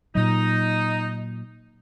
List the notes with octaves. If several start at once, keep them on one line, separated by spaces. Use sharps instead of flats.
A#2 F#3 D#4